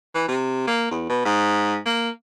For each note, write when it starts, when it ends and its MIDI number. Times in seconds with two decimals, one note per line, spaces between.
0.14 0.27 52
0.28 0.63 48
0.67 0.87 58
0.91 1.09 40
1.09 1.21 47
1.25 1.77 44
1.86 2.09 58